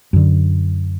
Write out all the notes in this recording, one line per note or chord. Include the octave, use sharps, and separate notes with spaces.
F#2 D3